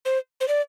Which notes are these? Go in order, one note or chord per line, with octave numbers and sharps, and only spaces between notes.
C5
C5
D5